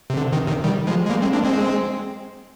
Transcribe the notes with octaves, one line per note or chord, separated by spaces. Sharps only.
C3
D3
C3 D#3
C3 D#3
D#3 G3
F3 G#3
G#3
G3 A#3
G#3 C4
A#3 D4
G#3 C4